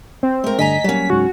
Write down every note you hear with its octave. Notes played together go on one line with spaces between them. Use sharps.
C4
G#3 A3 A#4
G2 D3 D#5 G#5 A#5 B6
F#3 G3 A#3 C#4
C#2 G#2 F#4